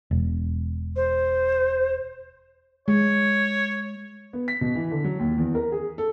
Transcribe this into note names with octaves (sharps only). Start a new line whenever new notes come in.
E1
C5
G#3 C#5
B3
B6
B2
E3
D3
F#3
D#2
E2
A#4
G#4
A4